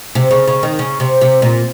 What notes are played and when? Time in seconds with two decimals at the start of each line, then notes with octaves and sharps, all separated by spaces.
0.15 C3
0.31 C#3
0.48 C#3
0.63 D#3
0.79 C#3
1.00 C3
1.21 C3
1.42 A#2